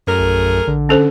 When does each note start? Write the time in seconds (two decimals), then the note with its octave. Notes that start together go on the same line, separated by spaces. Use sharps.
0.07 F#2 A3 G#4 A#4
0.20 A#1
0.68 A#1 D3
0.89 C#4 A4 C5